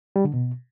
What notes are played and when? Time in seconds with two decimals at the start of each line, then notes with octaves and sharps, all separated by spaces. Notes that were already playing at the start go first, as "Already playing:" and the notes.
0.16 G3
0.25 D3
0.34 B2